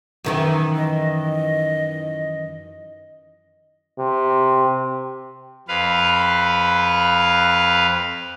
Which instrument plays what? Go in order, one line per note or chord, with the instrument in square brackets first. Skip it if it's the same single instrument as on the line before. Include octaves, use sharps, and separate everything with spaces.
[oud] F#2 D#3 E3
[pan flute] D#5
[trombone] C3
[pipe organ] F2 B4 F5